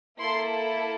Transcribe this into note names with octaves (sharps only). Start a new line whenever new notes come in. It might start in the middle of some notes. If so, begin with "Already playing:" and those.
A#3 E4 A4 C6